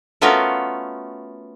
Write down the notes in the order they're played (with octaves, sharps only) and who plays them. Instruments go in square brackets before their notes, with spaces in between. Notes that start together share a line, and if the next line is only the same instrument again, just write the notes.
[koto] A3 B3 C#4 F4 F#4 A#4